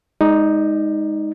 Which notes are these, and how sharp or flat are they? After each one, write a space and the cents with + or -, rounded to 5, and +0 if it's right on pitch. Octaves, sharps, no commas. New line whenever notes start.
G#3 +0 D#4 +10 D5 +30